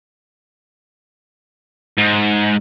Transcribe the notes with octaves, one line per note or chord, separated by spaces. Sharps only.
G#2